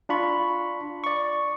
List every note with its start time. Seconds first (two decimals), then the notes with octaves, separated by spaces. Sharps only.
0.09 D4 F4 B5 C#6
1.04 D5 C#6